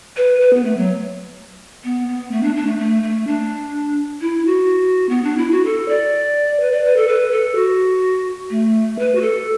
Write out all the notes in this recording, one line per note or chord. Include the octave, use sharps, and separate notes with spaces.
B4
B4
B3
A3
F#3
B3
B3
A3
D4
D4
A3
A3
A3
D4
E4
F#4
B3
D4
E4
F#4
A4
D5
B4
D5
B4
A4
B4
A4
F#4
A3
B4
F#4
A4